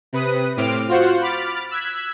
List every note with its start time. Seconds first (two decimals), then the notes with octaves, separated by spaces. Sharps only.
0.13 C3 B4 D#6
0.57 A2 C4 D6 F6 D7
0.89 F4 F#4 C5 F#5
1.21 B5 D6 F6 A6
1.71 E6 F#6 G#6 B6